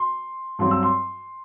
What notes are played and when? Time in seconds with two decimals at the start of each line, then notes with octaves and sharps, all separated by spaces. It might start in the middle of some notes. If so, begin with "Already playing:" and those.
Already playing: C6
0.59 G2 F#3 C4 C6
0.71 E6
0.83 C6